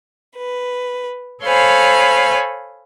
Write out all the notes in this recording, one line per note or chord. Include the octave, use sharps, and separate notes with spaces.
B4
A4 C5 C#5 F5 G#5 B5